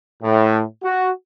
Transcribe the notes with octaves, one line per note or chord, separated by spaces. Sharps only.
A2
F#4